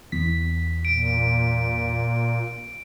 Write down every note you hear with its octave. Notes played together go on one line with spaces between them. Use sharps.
E2 B6
A#2 D7